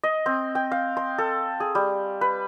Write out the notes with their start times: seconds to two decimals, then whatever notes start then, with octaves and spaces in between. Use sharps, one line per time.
0.04 D#5
0.26 C4
0.55 G5
0.72 F5
0.97 C6
1.18 A4
1.60 G#4
1.75 G3
2.21 B4